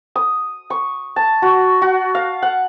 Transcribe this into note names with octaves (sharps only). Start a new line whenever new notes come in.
D#6
C#6
A5
F#4
F#4
F5
F#5